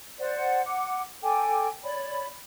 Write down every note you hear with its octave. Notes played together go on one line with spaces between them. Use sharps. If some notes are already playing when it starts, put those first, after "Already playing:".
C5 D5 F#5
F#5 D6
A4 G5 G#5 D6
C#5 D5 B5